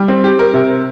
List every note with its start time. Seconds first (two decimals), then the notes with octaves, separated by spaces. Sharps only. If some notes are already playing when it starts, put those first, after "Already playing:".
Already playing: G3
0.08 C4
0.24 G4
0.39 A#4
0.54 C3